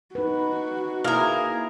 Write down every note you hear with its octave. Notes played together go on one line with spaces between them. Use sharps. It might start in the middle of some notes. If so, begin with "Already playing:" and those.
D#4 F#4 B4
A#3 E4 G#4 A#4